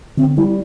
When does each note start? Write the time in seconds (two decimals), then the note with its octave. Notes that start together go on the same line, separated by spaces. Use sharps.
0.17 D3 C4
0.37 G3 E4